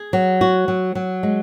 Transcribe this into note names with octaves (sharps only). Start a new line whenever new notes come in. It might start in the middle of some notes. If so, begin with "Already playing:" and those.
Already playing: G#4
F#3
F#4
F#3
F#3
G#3